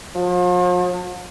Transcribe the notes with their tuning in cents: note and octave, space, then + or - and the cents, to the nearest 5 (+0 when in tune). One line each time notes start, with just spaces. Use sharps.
F3 +45